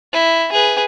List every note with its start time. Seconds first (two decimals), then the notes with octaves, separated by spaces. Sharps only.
0.13 E4
0.52 G#4 B4